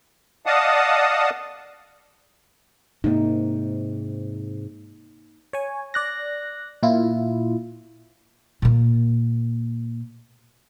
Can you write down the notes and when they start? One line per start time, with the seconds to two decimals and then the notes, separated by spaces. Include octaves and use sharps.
0.46 D5 D#5 F5 F#5 A5 D#6
3.04 G#2 C3 A#3 D#4
5.53 C#5 G#5
5.94 D5 F#6 A#6
6.83 A#2 E4 F4
8.62 A#2 A#3